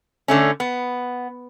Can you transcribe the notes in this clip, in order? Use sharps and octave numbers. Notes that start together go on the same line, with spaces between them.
D3 A3 C#4
B3